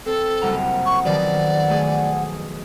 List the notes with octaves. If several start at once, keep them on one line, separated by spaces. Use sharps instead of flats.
C4 A4
F#1 C2 F#5 A#5
C#6
B1 D#3 F3 D5
A3 G#4